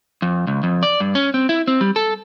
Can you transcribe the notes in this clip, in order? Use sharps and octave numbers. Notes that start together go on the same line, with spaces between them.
F2
C#2
F2
D5
G2
C#4
C4
E4
C4
G3
A4